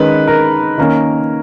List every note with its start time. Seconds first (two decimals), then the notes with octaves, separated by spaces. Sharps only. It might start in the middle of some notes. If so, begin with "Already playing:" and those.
Already playing: D#3 G#3 C#4 B4
0.27 A#4
0.78 D#3 A#3 C#4